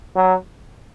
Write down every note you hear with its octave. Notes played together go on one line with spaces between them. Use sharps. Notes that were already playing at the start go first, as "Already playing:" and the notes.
F#3